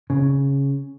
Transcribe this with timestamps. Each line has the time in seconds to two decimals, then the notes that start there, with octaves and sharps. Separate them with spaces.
0.10 C#3